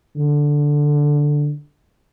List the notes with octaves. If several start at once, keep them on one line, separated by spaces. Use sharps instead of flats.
D3